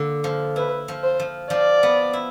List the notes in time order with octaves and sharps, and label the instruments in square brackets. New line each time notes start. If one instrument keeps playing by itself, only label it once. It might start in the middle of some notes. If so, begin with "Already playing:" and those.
Already playing: [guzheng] D3 A#3
F3
[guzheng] E4 [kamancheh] B4
[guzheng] F3
[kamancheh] C5
[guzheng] F3
[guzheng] F3 [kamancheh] D5
[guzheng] B3
E4